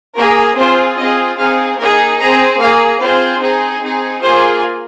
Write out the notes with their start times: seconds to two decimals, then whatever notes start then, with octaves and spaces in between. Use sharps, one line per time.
0.16 A#3 G#4 A#4
0.57 C4 F4 G#4 C5
0.98 C4 F4 G#4 D#5
1.38 C4 D#4 G#4 F5
1.79 A#3 D#4 G#4 A#4
2.20 C4 G#4 A#5
2.59 A#3 G#4 F5
3.00 C4 F4 G#4 C5
3.41 C4 D#4 G#4
3.82 C4 D#4 G#4
4.22 A#3 F4 G#4 C5